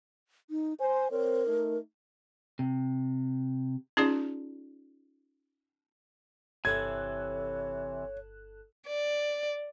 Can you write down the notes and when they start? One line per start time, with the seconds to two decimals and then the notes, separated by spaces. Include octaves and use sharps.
0.50 D#4
0.80 C5 G#5
1.11 C4 A#4 C5 C#5
1.47 A3 D#4
2.59 C3
3.97 C#4 D#4 F4 G#4 D5
6.65 G1 C3 E3 A4 C#5 F#6 G#6
8.87 D5